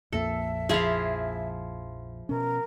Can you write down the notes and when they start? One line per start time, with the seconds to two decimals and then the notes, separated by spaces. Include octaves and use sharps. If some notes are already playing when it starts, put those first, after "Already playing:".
0.13 A#1 F2 A#3 A4 E5
0.69 F3 E4 F4 G#4 F5
2.29 B2 C#4 A#4